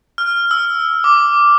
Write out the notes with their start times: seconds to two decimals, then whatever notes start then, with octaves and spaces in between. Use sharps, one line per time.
0.18 F6
0.51 E6
1.04 D6